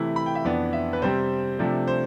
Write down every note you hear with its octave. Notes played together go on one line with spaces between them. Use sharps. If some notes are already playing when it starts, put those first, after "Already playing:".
Already playing: C3 E3 A3 E4
B5
G5
E5
F2 E3 B3 D4 D5
E5
B4
C3 G3 C4 C5
C3 F3 A3 D4
C5